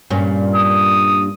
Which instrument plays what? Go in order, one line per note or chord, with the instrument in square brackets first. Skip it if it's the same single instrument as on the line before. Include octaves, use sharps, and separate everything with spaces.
[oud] G2 A#2 C#4
[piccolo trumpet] D#6